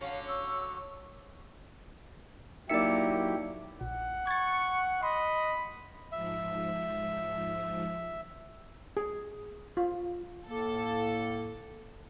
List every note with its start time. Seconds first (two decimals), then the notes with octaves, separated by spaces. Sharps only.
0.01 D3 F#3 C#4 F5
0.28 C#6 E6
2.69 F#3 A#3 D#4 E4 G4 D5 E5 C#7
3.81 A#1 F#5
4.27 C#6 G#6 A6
5.03 D#5 B5 C6
6.12 G#2 F3 E5
8.97 G#4
9.77 F4
10.47 A2 A#3 A4